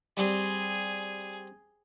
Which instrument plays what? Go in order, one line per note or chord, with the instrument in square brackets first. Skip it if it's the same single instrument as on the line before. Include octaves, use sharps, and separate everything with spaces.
[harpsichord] G3 C4 [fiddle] G#4